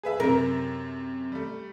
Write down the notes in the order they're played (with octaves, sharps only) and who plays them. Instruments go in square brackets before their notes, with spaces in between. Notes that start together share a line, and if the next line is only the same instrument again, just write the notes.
[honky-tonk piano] G#4 B4 E5
[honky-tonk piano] F#2 C3 [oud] A#4
[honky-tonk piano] G3 A3